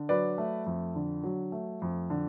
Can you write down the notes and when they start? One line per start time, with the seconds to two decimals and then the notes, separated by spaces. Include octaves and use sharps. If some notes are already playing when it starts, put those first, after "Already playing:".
Already playing: D3
0.09 F#3 B4 D5
0.38 A3
0.66 F2
0.95 D3
1.23 F#3
1.52 A3
1.82 F2
2.10 D3